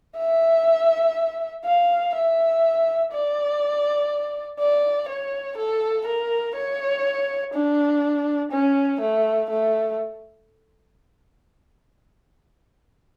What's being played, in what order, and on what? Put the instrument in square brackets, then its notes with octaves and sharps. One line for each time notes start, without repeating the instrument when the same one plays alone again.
[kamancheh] E5
F5
E5
D5
D5
C#5
A4
A#4
C#5
D4
C#4
A3
A3